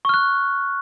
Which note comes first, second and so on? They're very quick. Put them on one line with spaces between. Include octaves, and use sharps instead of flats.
C#6 F6 F#6